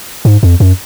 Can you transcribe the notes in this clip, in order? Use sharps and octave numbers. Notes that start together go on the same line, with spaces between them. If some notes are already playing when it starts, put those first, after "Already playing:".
G#2
F2
F#2